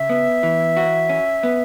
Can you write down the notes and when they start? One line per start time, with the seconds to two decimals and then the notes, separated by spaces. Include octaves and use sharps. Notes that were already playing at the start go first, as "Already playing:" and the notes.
Already playing: C#3 E5
0.09 B3
0.43 E3
0.77 F#4
1.09 C#4
1.43 B3